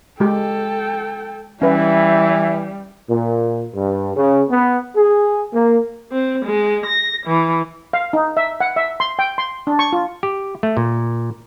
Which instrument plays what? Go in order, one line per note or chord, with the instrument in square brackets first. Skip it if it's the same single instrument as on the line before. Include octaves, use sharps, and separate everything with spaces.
[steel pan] G#3 G4 [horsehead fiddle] A4 G5
[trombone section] E3 [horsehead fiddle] G3 [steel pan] C#4 B4 [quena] E5
[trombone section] A#2
G2
C#3
B3
G#4
A#3
[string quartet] C4
G#3
A#6
E3
[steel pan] F5
D#4
E5
F#5
E5
C6
G5
C6
D4
C#6
F4
[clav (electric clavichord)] G4
A3
A#2